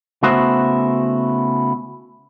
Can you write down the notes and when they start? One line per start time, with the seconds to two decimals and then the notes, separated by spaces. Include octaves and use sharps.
0.23 C#3 A3 B3 E4 F#4 C5